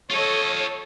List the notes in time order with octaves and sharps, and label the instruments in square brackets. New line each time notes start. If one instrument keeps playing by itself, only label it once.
[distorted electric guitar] F4 D#5 [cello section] A4 C#5